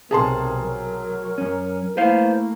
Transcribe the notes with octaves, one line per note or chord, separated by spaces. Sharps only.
B1 C3 G#4 A#4 A5 C6
F#3
F#2 C#4
A3 A#3 E4 B4 C5 F5